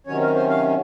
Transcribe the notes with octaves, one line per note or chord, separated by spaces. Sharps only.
C3 D#3 F#3 C#4 C#5
A#4
C5
F5